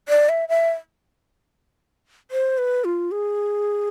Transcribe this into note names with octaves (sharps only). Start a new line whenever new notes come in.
D5
E5
E5
C5
B4
F4
G#4